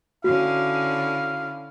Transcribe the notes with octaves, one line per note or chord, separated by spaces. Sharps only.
D3 C#4 E4 F#4 F5